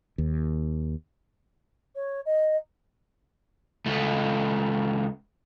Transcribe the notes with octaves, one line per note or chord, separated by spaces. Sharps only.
D#2
C#5
D#5
C#2 A3